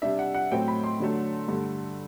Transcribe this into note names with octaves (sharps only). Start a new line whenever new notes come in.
C3 G3 D4 E5
F#5
F#5
A2 F#3 C4 G5
B5
C6
D3 F#3 A3
G2 D3 A3